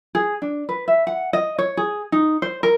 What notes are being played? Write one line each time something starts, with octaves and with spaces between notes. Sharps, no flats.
G#4
D4
B4
E5
F#5
D#5
C#5
G#4
D#4
C5
A#4